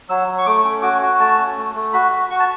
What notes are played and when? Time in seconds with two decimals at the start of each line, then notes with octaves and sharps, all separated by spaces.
0.09 F#3 E6
0.28 F#3
0.38 C#6
0.46 A3 D6
0.65 C#4
0.82 F#4 D6
1.02 F#4
1.20 A3 A5
1.38 C#4
1.57 A3
1.75 A3
1.93 F#4 B5
2.12 F#4
2.30 F#4 C#6
2.40 A5